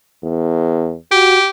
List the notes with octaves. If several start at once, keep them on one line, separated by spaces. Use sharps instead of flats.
E2
F#4 G4